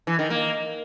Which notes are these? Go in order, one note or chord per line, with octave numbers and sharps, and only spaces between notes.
E3
D#3
A#3